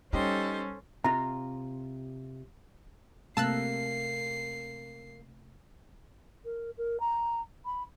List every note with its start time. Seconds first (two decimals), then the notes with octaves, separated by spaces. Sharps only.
0.13 G3 C#4 D#4 G4 A4 C5 D#5
1.04 C3 F4 A#5
3.37 C3 A3 A#3 A5 E6 F#6 C7
6.45 A#4
6.77 A#4
7.00 A#5
7.65 B5